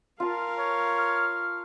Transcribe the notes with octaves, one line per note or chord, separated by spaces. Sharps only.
F4 A#4 F5 A5
C#5
F6